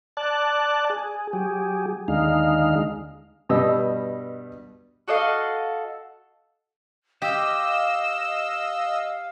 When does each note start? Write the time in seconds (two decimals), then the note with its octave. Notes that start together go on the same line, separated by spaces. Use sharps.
0.17 D5 A5 F#6
0.90 G#4
1.33 F#3 G4 G#4
2.08 D#2 D3 G#3 D#4 F5
3.49 G2 B2 G3 D#5 E6
5.08 F#4 A4 D#5 F5
7.22 G4 D#5 F5 E6 E7